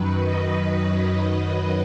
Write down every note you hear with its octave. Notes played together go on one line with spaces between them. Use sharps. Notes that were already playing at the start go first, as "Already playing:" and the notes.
Already playing: F#2 D#3 F#3 B4
B4 D#5
B4 D#5